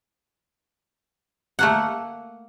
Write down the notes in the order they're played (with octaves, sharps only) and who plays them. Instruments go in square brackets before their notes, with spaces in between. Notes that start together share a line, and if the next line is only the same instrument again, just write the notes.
[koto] A3 A#3 F#5